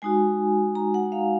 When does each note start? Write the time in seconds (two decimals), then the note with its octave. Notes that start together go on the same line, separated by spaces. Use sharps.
0.02 G#3 D#4 F#4 G#5
0.75 A#5
0.94 F#5
1.12 F5